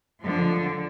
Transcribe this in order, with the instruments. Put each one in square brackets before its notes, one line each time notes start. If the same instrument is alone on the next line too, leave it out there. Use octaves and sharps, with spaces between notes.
[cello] D3 F3